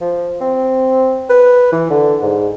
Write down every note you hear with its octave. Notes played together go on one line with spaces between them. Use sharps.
F3
C4
B4
E3
D3
G#2